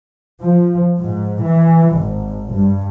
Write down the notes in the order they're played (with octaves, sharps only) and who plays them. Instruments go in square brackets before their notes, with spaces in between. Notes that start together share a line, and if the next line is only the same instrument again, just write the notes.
[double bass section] F3
G#2
E3
G#1
G2